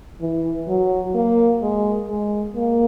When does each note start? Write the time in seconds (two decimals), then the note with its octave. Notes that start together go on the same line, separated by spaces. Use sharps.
0.21 E3
0.68 F#3
1.15 A#3
1.62 G#3
2.09 G#3
2.55 A#3